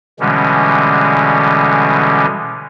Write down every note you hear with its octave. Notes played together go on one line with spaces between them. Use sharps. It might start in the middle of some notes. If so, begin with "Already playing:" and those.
B2 D3 E3 G3 G#3 C#4